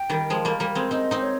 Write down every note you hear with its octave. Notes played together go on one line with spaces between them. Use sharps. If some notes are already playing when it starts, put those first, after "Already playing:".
Already playing: G5
D#3 G3
F3 G#3
G3 A#3
G3 A#3
G#3 C4
C4 D#4 D#5
C4 D#4
C#5